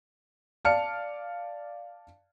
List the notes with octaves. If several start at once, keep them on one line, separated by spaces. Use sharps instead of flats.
D5 F5 A5 F6 C#7